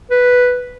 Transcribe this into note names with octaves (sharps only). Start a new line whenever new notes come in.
B4